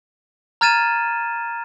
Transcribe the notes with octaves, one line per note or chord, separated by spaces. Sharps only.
A#5 F6 G#6 A6 D#7 E7